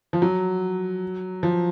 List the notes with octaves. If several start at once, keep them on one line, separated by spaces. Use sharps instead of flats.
F3
F#3
F3